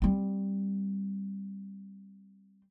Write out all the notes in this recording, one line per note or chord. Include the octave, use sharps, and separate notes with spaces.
G3 C4